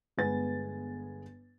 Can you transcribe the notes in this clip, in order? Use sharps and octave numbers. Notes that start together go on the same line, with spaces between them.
G1 G#3 B3 B4 G#5 A6